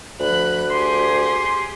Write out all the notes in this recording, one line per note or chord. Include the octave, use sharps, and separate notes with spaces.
D2 F3 B5 F#6
G4 G#4 C6